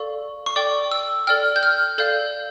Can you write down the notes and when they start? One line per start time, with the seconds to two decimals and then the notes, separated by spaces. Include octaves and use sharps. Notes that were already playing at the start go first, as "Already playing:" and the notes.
Already playing: A4 D5 F5 C#6
0.46 C#6
0.56 A4 D5 G5 D6
0.92 E6
1.27 A4 D5 G5 F6
1.56 G6
1.63 F6
1.98 A4 D5 F5 G6